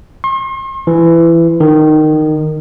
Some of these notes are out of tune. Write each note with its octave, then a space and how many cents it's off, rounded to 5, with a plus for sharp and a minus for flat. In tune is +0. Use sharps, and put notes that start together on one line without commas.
C6 +45
E3 +20
D#3 -15